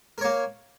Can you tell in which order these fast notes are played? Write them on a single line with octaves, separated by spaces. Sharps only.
A#4 C#5 A#3